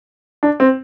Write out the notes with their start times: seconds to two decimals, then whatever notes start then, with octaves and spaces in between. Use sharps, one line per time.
0.43 D4
0.60 C4